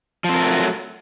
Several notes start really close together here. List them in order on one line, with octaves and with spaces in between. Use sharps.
F3 C4 A#4 A3 F#3